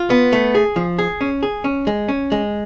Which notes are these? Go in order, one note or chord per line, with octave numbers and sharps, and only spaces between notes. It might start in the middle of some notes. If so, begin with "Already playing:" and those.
Already playing: F4
B3
A3
G#4
F3
G#4
C#4
G#4
C#4
G#3
C#4
G#3